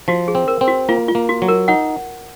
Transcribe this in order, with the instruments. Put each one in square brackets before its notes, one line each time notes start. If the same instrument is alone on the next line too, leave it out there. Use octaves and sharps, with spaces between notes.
[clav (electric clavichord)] F3 [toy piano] F#4
[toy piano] G#4
[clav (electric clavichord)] C4
[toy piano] A#4
[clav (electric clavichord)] C4
[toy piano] F#4
[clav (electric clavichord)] A#3 [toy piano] F4
[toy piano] F4
[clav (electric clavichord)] A#3
[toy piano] F#4
[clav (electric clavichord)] F#3
[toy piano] A#4
[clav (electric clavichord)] D#4 [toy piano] F#5